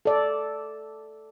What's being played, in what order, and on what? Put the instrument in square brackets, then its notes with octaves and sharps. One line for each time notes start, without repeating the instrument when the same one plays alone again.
[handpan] A4 D5